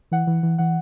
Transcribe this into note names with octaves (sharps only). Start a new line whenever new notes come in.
E3 F#5
E3
E3
E3 F#5